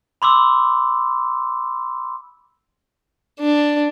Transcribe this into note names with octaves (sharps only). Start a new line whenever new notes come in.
B5 C6 D6 E6
D4